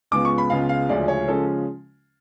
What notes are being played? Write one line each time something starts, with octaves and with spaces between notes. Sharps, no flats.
C#2 C#3 G#3 B3 F4 D6
C#6
B5
C#2 C#3 G#3 B3 F4 F5
F5
D2 C#3 F3 G#3 C#4 D5
C#5
C#3 F3 G#3 C#4 A4